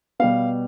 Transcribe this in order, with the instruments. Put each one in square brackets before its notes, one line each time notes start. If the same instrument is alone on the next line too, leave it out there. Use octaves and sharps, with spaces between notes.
[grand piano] B2 G3 B3 F5